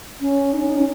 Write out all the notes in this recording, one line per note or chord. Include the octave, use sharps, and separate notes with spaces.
C#4
D#4
C#4
D#4
C#4